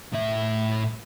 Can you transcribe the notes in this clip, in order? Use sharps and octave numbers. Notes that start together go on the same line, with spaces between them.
A2 E5